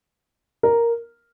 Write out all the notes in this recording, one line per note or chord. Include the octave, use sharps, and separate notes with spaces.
A#4